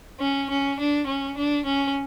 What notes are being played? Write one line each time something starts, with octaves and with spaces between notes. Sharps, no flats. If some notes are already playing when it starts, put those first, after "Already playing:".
C#4
C#4
D4
C#4
D4
C#4